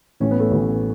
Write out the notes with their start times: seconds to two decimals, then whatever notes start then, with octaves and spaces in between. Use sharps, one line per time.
0.20 A1 A2 E3 C#4
0.31 B3
0.40 A3
0.51 A1 A2 E3